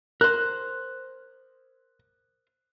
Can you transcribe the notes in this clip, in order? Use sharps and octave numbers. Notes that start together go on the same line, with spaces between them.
A#4 C5 F#6